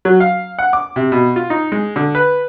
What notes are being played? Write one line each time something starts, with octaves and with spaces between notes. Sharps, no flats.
F#3
F5
F#5
D6
C3
B2
F4
D#4
G#3
D3
B4